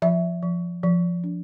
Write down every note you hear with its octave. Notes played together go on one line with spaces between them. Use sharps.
F3 E5
F3
F3
D4